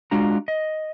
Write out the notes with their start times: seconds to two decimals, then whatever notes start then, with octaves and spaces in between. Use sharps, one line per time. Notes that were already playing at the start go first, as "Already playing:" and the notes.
0.11 G#3 D4 F4 F#4 A#5
0.48 D#5